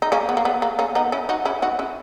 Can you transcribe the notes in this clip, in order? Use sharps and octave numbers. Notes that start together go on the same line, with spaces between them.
D#4
A#3 C#4
B3
A#3
B3
A#3
A#3 C#4
B3 D#4
C#4 E4
D#4 F#4
C#4 E4
D#4 F#4
C#4 E4